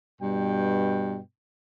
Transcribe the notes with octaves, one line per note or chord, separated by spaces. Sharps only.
G2 B2 G5